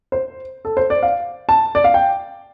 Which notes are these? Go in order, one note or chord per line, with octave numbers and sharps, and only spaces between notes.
C5
A4
C5
D5
F5
A5
D5
F5
G5